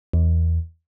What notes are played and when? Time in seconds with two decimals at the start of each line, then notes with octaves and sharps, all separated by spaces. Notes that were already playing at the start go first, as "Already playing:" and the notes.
0.13 E2